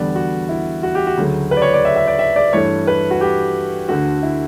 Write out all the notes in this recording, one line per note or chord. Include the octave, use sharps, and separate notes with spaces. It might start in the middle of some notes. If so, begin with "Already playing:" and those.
Already playing: E2 D3 G3 B3 D5
F#4
E4
F#4
G4
F#4
D2 C#3 F#3 A3
B4
D5
C#5
D5
E5
E5
D5
E5
D5
G2 E3 A3 C#5
B4
F#4
G4
D2 D3 A3 F#4
E4